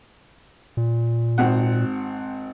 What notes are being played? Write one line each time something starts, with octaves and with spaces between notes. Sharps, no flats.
A#2
G#1 C4 F#5